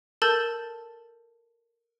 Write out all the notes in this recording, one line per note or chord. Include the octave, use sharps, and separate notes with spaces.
A4 A#4 A5 E6 G6 A6